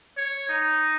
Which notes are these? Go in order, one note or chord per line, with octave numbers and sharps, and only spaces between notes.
C#5
D#4